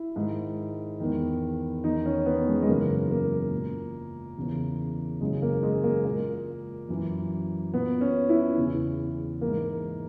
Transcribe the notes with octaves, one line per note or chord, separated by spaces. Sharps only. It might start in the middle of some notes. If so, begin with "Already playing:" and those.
Already playing: E4
G#2 D#3
E2 D#3
E2 D#3 D#4
C#4
B3
G#3
G#3
F#2 C#3 E3 A#3
A#3
A#2
E2 C#3 E3
F#2 C#3 E3 G#3
A#3
G#3
A#3
A#2 A#3
F#2 E3
A#2 B3
C#4
E4
E2 C#3 E3
E3 A#3
G#2